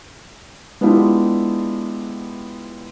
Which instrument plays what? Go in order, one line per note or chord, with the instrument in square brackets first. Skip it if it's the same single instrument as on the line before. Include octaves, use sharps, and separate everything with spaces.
[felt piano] G#3 B3 D4 E4 F4 G4